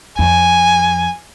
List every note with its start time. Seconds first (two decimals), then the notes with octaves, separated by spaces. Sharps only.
0.19 F2 G#5